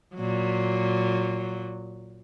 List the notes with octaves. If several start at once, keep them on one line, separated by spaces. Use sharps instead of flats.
A#2 F#3